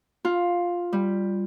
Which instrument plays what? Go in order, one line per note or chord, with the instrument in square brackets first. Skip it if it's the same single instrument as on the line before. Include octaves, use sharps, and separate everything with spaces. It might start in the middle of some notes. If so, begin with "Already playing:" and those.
[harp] F4
G3